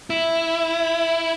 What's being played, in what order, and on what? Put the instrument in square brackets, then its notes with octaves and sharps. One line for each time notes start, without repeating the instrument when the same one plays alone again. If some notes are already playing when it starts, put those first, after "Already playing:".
[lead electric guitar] E4